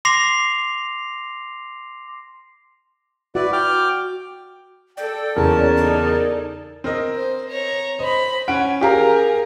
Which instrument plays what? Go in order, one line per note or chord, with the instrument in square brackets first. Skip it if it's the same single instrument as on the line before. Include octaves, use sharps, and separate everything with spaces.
[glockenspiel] C6 D6 A#6 C7 F7
[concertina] E4 B4 D5 [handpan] F#4
[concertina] G5 D6 F6
[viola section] A4 [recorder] D5 [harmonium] G5
[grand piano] E2 C#3 [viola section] A#3 C#4 [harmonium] A#4 A5
[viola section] D#4 G#4 A4 [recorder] D5
[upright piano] C4 A#4 D#5
[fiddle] C5
C#5 A#5
[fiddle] C5 B5 [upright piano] D#5
[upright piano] C#4 D7 [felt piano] F#5 [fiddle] G#5
[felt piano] G4 F5 A#5 [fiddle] G#4 A#4